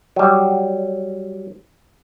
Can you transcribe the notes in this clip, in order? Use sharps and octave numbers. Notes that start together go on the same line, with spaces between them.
F#3 G3